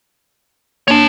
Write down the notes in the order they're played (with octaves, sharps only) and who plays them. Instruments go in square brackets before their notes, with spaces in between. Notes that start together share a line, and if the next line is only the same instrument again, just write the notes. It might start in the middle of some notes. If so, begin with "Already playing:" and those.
[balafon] A#3 D4 [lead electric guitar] C#5 A5